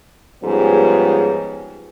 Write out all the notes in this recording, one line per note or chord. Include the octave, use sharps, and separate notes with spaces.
G#2 F3 G3 B3 C#4 G#4